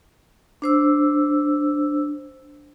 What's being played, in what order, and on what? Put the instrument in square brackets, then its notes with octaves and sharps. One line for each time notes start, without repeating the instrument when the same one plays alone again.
[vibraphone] D4 C5 E6